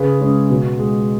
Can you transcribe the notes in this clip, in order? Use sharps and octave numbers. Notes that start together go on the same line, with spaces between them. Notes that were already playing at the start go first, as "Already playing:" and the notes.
Already playing: C#3 G#4 B4
G#3 C#4
B2 F#4
G#3 B3